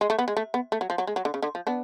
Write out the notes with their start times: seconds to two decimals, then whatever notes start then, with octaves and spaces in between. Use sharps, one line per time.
0.01 G#3
0.10 A3
0.19 B3
0.28 G#3
0.37 A3
0.54 B3
0.72 A3
0.81 F#3
0.90 F3
0.98 F#3
1.07 G#3
1.16 F#3
1.25 D3
1.34 C#3
1.42 D3
1.55 F3
1.67 B3 D4